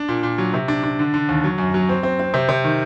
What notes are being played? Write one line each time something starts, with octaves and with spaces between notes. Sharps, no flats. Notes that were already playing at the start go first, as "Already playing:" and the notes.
Already playing: D4
A#2
A#2
F#3
C3
D4
D4
D3
D3
D#2
F#3
F#2
F#3
C4
C4
C4
C3
C3
D#3